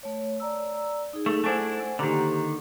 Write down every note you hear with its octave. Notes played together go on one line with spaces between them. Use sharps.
A3 C#5
D5 A#5 E6
D#4 G#4
A3
A3 D4 E4 C5 F#5 G#5
D3 D#3 A#3 G4 A#5